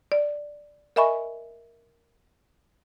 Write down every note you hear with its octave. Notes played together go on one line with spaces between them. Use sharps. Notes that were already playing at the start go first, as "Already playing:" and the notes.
D5
A#4 D#5 E5 G#5 B5 C#6